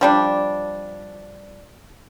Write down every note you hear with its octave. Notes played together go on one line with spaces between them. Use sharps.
F3 G3 D4